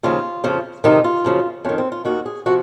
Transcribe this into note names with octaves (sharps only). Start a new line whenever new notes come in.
D#2 C#3 F3 F4
F2 C#3 F3
F2 C3 D#3 D#4
F4
F#2 C#3 F3
F2 D#3 C#4
C4
F4
D#2 D#3 F#4
G#4
C3 F3 F#4